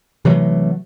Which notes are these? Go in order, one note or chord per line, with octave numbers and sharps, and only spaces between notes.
C3 E3 F#3 A3